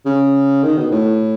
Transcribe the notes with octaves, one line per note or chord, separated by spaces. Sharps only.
C#3
D#3
B2
A2